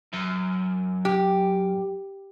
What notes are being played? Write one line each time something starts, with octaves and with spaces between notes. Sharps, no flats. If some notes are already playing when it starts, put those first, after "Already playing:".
F#2
G4